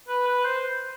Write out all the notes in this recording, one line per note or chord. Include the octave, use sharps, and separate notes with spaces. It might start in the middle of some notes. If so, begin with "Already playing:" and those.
B4
B4
C5